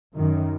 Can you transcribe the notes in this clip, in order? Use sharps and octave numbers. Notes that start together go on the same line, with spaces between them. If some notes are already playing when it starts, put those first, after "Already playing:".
F#2 D#3